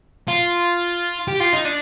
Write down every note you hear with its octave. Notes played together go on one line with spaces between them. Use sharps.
F4
G4
F4
D#4
D4